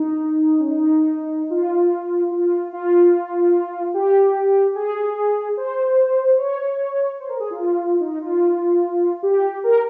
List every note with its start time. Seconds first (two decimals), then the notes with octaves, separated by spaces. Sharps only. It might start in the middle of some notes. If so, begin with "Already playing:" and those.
Already playing: D#4
0.60 C#4
0.69 D#4
1.50 F4
2.31 F4
2.73 F4
3.94 G4
4.75 G#4
5.57 C5
6.38 C#5
7.20 C5
7.29 A#4
7.40 G#4
7.50 F4
8.00 D#4
8.21 F4
9.23 G4
9.64 A#4